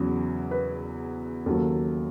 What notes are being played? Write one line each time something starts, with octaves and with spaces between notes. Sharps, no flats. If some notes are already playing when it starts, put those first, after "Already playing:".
Already playing: E2 C#3 F#3
B4
D#2 C#3 F#3 A4